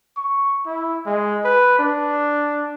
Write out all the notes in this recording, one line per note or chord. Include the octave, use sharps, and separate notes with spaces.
C#6
E4
G#3
B4
D4